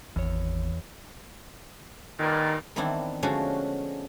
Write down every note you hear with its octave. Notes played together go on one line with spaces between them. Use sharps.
G#1 E2 C#5
G2 A#2 D#3
D#3 E3 B3 C4 D4 E4
D3 F3 G#3 A3 C#4 F#4